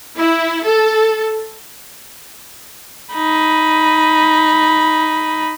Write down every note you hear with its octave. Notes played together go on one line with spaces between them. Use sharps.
E4
A4
D#4 B5